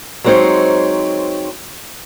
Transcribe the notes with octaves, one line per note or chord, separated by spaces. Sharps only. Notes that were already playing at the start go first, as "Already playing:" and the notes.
F#3 G#3 C4 D#4 C5 C#5